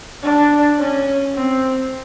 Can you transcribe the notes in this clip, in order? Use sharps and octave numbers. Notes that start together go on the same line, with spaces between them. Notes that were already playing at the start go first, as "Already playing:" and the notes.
D4
C#4
C4